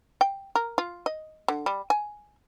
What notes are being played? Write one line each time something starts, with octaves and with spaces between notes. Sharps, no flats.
G5
A#4
F4
D#5
D3
G3
G#5